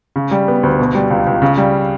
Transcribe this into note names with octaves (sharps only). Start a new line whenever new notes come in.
C#3
G3
B3
D2
B2
G3
C#2
C#2
C#3
G3